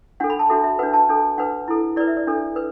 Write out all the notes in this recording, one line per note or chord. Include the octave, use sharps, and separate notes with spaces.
D4 A4 F#5
B5
A5
D4 F#4 A4 E5
E5
D4 B4 F#5
A5
D4 A4
D4 B4 F#5
E4 A4
E4 B4 D5
E5
D5
D4 A4
B4